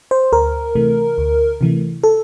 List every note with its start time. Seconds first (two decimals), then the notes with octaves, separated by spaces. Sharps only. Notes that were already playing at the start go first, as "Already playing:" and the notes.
0.11 C5
0.32 D2 A#4
0.75 C3 E3 A3
1.18 D2
1.61 C3 E3 A3
2.04 A4